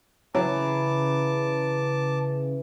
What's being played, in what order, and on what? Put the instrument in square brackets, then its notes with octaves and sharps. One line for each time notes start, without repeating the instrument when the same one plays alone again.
[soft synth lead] C#3 [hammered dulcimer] E3 [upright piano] F#3 [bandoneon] A5 D6